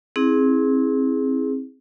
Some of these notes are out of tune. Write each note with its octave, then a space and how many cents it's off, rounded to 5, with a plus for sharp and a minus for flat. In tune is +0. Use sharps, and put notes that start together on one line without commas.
C4 +20 E4 -30 G#4 +0